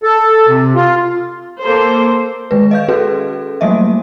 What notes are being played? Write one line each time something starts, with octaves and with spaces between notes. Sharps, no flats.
A4
C3
F4
A#3 A4 C5
D#3 G#3 B4
D#5 F5 G6
C#4 F#4 G#4 A4 B4
F#3 G3 A3 A#3 D#5 E5